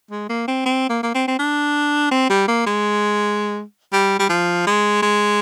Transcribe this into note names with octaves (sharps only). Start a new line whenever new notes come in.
G#3
A#3
C4
C4
A#3
A#3
C4
C4
D4
C4
G3
A#3
G#3
G3
G3
F3
G#3
G#3